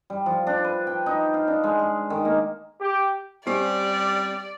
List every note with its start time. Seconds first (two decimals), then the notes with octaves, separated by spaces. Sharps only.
0.10 G3
0.26 F3
0.47 D4
0.64 B4
0.87 G5
1.06 D#4
1.34 F5
1.48 D4
1.64 G#3
1.79 G#4
2.10 D#3
2.25 A#3
2.80 G4
3.47 G3 C4 C#4 G4 D5